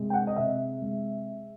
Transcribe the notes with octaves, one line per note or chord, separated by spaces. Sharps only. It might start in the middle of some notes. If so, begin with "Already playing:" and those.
Already playing: C3 G#3
G5
F#5
D#5
C3 E5
G#3